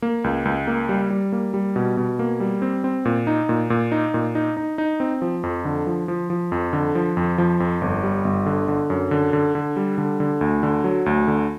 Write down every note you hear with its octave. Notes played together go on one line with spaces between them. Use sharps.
A#3
C#2
C#2
A#3
G3
G3
A#3
G3
B2
B2
A#3
G3
C4
C4
A#2
D#4
A#2
A#2
D#4
A#2
D#4
D#4
D#4
C4
F3
F2
D3
F3
F3
F3
F2
D3
F3
F2
F3
F2
G1
G3
G1
D3
D3
F#2
D3
D3
D3
G3
D3
D3
D2
D3
F#3
D2
D3